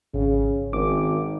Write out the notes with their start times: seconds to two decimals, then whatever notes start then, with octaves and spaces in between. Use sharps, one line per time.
0.14 G#1 C#3
0.73 G#1 D#3 D6